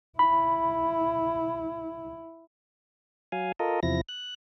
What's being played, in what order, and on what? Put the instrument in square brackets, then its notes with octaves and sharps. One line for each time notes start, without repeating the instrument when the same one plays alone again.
[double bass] E4 [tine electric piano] B5
[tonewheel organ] F#3 F5 G#5
F4 A4 A#4 D#5
E2 C3 F3 E4 A#6
F#6